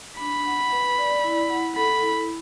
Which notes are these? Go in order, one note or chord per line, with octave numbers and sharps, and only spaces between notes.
D4 B5
F#5
B4
D5
E4
F#5
A4 B5
E4